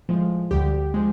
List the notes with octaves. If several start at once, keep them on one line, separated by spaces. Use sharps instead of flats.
A2 F3 G#3
D2 D3 G3 G4
F3 G#3